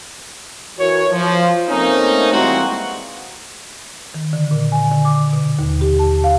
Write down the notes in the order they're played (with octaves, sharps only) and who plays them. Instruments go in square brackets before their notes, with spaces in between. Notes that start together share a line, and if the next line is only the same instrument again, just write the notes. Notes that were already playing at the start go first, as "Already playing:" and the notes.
[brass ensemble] E3 F#4 A#4 C#5
F3
A3 A#3 C4 C#4 D#4
E3 G3 G#3 A#3 C4 F#4
[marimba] D#3
D3
A#2
G#5
D3
D6
B2
D#2
G4
A5
F5